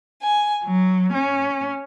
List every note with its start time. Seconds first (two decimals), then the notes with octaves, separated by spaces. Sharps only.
0.22 G#5
0.65 F#3
1.13 C#4